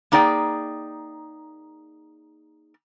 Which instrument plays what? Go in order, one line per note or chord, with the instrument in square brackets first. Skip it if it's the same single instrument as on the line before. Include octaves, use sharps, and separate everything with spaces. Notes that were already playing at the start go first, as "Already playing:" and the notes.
[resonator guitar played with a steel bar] A#3 D#4 G#4 D5 G5